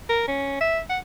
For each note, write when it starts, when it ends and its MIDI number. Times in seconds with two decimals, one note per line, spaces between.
0.09 0.23 70
0.28 0.60 61
0.60 0.79 76
0.89 0.99 78